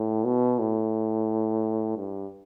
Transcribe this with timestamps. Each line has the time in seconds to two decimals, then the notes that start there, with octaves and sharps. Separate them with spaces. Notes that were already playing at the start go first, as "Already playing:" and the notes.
Already playing: A2
0.24 B2
0.59 A2
1.97 G2